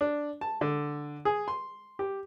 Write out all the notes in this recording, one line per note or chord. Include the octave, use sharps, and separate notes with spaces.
D4
A5
D3
G#4
C6
G4